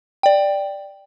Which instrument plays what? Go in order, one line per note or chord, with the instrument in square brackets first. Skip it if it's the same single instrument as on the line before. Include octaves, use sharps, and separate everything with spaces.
[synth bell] D5 G5